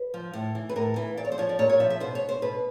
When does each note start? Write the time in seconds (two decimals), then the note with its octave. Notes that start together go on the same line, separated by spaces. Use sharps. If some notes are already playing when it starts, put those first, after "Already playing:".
Already playing: B4
0.14 F3
0.33 A2
0.55 E3
0.69 B4
0.76 A2 A#4
0.96 E3 B4
1.17 A#2 D5
1.25 C#5
1.32 C5
1.38 F3 C#5
1.49 D5
1.59 A#2 C#5
1.70 C#5
1.80 F3 E5
1.90 E5
2.00 B2 C5
2.15 C#5
2.29 C5
2.42 B2 B4